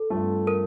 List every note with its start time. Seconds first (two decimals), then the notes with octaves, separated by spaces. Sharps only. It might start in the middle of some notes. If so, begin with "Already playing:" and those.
Already playing: A4
0.10 G2 F3 A3 C4
0.47 A#4